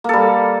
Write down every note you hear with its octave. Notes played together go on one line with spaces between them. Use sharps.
G3 A#3 A4